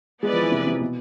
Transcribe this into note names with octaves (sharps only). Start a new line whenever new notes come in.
G#3 B3 E4 B4 D5
F3
E3
C3
C3
B2